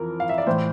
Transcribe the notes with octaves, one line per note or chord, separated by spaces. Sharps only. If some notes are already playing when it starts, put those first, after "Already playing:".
Already playing: F2 E3 A#4
F5
E5
D5
A2 E3 C5